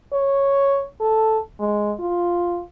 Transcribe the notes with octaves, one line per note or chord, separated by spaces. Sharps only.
C#5
A4
G#3
F4